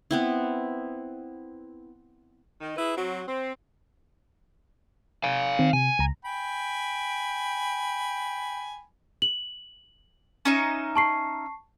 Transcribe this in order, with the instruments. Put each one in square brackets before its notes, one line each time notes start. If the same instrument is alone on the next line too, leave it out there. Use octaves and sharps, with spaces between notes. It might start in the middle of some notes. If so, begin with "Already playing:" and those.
[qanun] B3 C4 E4
[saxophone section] D#3
E4 G#4 B4
F#3 C4
C4
[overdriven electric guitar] F5 G#5
[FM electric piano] D#3 C4
[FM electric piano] C3 [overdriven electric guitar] G#5
[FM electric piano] C#2 A#5
[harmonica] G5 G#5 B5
[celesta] F#7
[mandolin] C#4 D#4 E5
[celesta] A5 C#6 C7